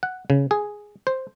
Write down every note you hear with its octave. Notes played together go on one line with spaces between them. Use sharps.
F#5
C#3
G#4
C5